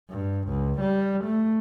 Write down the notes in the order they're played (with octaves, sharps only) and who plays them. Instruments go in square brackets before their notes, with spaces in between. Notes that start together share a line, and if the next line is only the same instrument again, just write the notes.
[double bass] G2
C#2
G3
A3